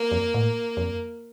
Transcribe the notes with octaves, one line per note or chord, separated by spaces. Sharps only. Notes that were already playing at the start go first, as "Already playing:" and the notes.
Already playing: A#3
F2
A2
F2